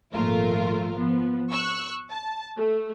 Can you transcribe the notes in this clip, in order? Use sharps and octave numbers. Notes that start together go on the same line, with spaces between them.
G#1 A#2 F3 A3 F4 A#4
F3 B3
C#6 E6 F#6
A5
A3